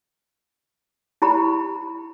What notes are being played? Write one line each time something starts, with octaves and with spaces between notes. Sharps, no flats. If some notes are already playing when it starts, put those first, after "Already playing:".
E4 G4 A#5 B5